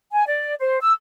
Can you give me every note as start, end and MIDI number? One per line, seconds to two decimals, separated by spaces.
0.12 0.24 80
0.27 0.54 74
0.60 0.78 72
0.80 0.92 88